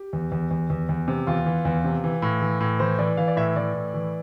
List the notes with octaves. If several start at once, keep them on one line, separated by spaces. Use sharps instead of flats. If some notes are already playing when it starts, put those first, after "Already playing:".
Already playing: G4
E2
E2
E2
E2
E2
C3
E2 F4
E3
E2
C3
E3
A2
E3
A2
E3 C5
E3 D5
E3 F5
D5
A2 E5
E3 D5
A2
E3